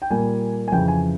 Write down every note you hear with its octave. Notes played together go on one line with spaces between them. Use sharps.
G5
A#2 G3 A#3 G#5
G#5
F2 C#3 E3 G5
G#5